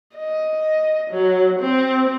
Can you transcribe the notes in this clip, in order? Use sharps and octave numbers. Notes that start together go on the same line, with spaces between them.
D#5
F#3
C4